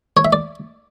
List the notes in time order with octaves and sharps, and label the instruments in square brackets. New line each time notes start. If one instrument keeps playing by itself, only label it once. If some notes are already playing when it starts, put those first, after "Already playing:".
[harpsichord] C#5
E5
D5